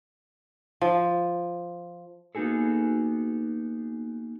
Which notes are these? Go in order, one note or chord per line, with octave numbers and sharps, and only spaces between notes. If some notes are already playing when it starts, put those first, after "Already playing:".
F3
A#3 B3 D#4 F#4 G#4 A4